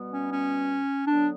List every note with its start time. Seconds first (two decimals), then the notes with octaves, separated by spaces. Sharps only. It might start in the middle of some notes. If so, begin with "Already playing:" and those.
Already playing: B2 G3 B3
0.12 C#4
0.31 C#4
1.07 D3 F#3 B3 D4